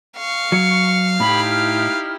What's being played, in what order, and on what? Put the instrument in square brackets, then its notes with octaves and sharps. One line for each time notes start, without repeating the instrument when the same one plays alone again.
[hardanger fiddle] F5 [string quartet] C#6
[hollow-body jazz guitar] F#3 [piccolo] C#7
[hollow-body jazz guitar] A2 [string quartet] D#4 E4 G4 [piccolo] B5
[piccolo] F6